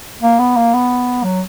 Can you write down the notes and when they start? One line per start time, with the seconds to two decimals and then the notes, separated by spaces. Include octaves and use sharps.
0.22 A#3
0.39 B3
0.57 A#3
0.74 B3
1.23 F#3